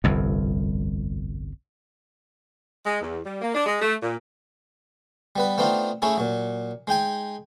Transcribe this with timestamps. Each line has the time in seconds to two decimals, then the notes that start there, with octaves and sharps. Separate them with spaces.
0.04 G1 C2 F2
2.85 G#3
3.02 E2
3.25 G3
3.41 A#3
3.55 D4
3.66 G#3
3.81 A3
4.01 A#2
5.36 G3 B3 B4
5.58 A3 B3 C4 D4 D#4 F4
6.02 A3 C#4 D#4 E4 G#4
6.18 A#2 F#3
6.87 G#3 D#4 G5 G#5